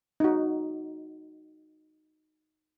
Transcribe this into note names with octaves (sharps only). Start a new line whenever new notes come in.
D#4 F#4